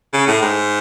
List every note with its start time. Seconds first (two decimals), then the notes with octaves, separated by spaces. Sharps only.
0.13 C#3
0.27 A2
0.42 G#2